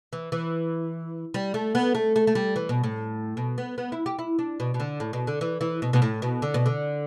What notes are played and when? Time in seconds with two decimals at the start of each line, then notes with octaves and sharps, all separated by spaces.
0.13 E3
0.32 E3
1.34 G3
1.54 A3
1.75 B3
1.95 A3
2.16 A3
2.27 A3
2.35 G3
2.56 E3
2.69 B2
2.84 A2
3.37 B2
3.58 B3
3.78 B3
3.92 E4
4.06 G4
4.19 E4
4.39 D4
4.60 B2
4.74 B2
4.80 D3
5.00 A2
5.13 B2
5.27 D3
5.41 E3
5.61 E3
5.82 B2
5.93 B2
6.02 A2
6.22 B2
6.42 D3
6.54 B2
6.66 D3